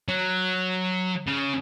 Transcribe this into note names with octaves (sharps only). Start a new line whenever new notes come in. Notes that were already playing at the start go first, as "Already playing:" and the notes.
F#3
C#3